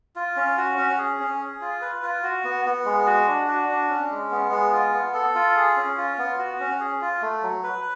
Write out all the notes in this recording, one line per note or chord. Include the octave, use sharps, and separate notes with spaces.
F4
C#4
F#4
C#4
G#4
C#4
G#4
F4
B4
F4
F#4
B3
B3
G#3
F#4
D4
F#4
D4
C#4
G#3
B3
G#3
F4
B3
A4
F4
G#4
C#4
F4
B3
F#4
C#4
G#4
F4
A3
F#3
B4